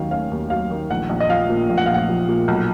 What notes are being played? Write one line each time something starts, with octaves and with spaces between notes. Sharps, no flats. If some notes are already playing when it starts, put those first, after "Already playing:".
Already playing: D#2 D#3 F#3 C#4 F5
C#4 F5
D#2
F#3 F5
D#3
A#1 F#5
A#1
D#5
F3 F5
A#2
A#1
F#5
A#1 F5
F#5
F3
A#2
B1